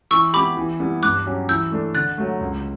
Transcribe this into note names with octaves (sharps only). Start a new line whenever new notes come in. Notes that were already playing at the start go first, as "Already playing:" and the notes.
E3 C#6 E6
B3 E4 G4 B5 D6
E3
G3 B3 E4
G2 D6 F#6
F#3 C#4 G4
E3 E6 G6
A3 D4 A4
D3 F#6 A6
F#3 A3
C#2